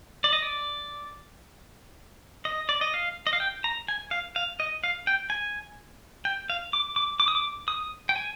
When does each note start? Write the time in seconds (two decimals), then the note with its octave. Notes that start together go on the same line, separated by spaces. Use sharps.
0.24 D5
0.33 D#5
0.42 D5
2.45 D#5
2.69 D5
2.81 D#5
2.94 F5
3.27 D#5
3.33 F5
3.40 G5
3.64 A#5
3.88 G#5
4.11 F5
4.36 F5
4.60 D#5
4.84 F5
5.07 G5
5.30 G#5
6.25 G5
6.50 F5
6.73 D6
6.96 D6
7.20 D6
7.28 D#6
7.35 D6
7.68 D#6
8.09 G5
8.16 G#5